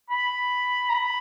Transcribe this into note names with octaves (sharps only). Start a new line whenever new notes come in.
B5
A#5
B5